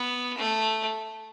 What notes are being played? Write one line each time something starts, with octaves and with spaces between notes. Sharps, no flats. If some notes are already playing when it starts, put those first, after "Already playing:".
Already playing: B3
A3